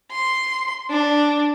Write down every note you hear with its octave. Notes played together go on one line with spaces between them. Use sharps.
C6
D4